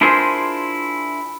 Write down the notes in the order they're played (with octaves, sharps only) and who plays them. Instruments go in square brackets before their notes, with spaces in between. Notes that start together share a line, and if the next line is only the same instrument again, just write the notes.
[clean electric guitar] D4 E4 F4 G#4 A#4 C5